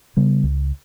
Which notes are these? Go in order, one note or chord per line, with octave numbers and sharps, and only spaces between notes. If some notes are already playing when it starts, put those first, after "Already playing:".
C#3 G3 B3
C#2